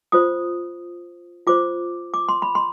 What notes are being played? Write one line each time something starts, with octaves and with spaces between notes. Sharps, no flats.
F4 C5 D#6
F4 C5 D6
D6
C6
B5
C6